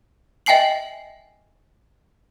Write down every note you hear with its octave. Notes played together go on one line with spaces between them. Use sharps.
D#5 E5 G5 G#5 C7 F#7